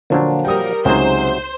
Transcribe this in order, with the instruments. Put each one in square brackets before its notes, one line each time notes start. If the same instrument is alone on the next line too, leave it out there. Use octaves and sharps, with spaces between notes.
[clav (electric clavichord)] A#2 F3 F#3 [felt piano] D3 A#3 D4
[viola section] G3 A#4 [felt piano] G5 D#6
[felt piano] C#2 D#4 [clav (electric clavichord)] C3 F#3 G#4 [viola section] C5